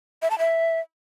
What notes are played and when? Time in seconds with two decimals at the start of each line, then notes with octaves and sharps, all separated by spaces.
0.22 E5
0.31 A5
0.39 E5